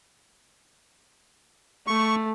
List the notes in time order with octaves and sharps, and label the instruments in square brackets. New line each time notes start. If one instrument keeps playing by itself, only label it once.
[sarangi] A3 [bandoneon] C#6